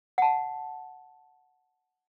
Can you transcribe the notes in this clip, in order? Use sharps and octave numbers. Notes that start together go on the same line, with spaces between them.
F#5 A5